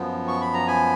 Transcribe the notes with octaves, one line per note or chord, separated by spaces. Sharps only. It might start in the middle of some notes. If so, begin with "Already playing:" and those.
Already playing: F#2 F3 B3
C#6
B5
A#5
G#5 B5